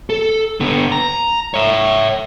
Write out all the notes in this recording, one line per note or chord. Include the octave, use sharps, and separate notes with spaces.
A4
D3 B3
A#5
C#5 E5